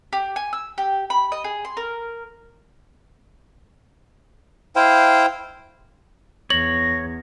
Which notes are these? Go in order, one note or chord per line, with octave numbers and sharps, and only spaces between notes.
G4
G#5
E6
G4
B5
D#5
G#4
C6
A#4
E4 C5 F5 G5
E2 C#5 A#6 F#7